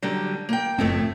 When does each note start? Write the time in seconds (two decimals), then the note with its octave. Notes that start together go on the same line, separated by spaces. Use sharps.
0.03 D3 F#3 G3
0.49 A#3 G5
0.79 F#1 F2 A2 A3 C4